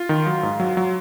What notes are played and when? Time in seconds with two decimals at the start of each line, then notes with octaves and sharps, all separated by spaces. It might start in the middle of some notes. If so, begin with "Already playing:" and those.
Already playing: F4
0.09 D#3
0.27 F#3
0.43 G#2
0.60 F#3
0.77 F#3